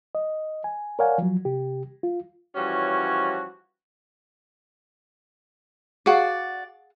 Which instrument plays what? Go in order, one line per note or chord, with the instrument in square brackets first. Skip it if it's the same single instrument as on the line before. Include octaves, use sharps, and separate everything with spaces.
[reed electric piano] D#5
G#5
A#4 C#5 D5 F5 F#5 G#5
F3 F#3
C3 G4
F4
[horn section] E3 F3 G3 C#4 F#4 C#5
[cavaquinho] F#4 D5 [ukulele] G#4 F5 F#5